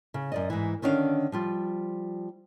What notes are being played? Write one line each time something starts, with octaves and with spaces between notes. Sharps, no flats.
C#3
F#2 D5 D#5
G#2 E3
D3 D#3 C#4 D4 B4 F5
F3 G3 F4